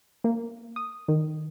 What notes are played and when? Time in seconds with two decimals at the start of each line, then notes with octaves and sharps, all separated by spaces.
0.24 A#3
0.76 D#6
1.08 D#3